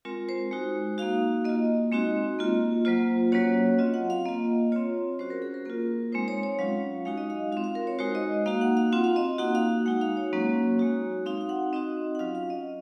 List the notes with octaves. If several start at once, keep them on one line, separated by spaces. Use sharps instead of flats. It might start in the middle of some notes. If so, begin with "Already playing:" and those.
G#3 C4 F4 A#4
C5
G#3 D#4 F#4
A#3 D#4 F#4 F5
A#3 F4 D#5
G#3 C4 D#4 F#4
A#3 F4
F#3 A#3 F4 C5
F#3 A#3 C#4 F#4 C#5
C4 F4 D#5
F#5
F5
A#3 F4 D#5
C4 F4 C#5
F#3 C#4 F#4 C5
A#4
G#4
A#4
A#3 F4 A#4
G#3 C4 D#4 C5
C#5
C#5
F#3 C#4 F4 F5
G#3 D#4 F#4 F5
D#5
F5
C4 F4 F5
F5
A#4
C#5
G#3 D#4 F#4 C5
D#5
A#3 D#4 F#4 F5
F#5
F5
C4 F4 F#5
F5
D#5
A#3 D#4 F#4 F#5
F5
G#3 D#4 F#4 F#5
F5
C#5
F#3 A#3 C#4 F#4
G#3 D#4 F#4
C4 D#4 F#4 F5
F5
F#5
C4 D#4 F#4 D#5
F#5
F#3 C#4 F4 F5
F5
D#5